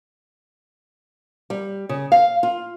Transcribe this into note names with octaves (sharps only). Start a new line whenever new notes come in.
G3
C#3
F5
F4